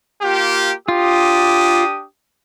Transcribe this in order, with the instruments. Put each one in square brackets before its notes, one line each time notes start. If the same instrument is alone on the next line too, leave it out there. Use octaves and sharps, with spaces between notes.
[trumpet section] A#3 F4 G4
[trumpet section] D4 G4 D#6 [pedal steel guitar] F4